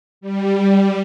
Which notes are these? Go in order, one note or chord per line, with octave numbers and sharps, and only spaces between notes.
G3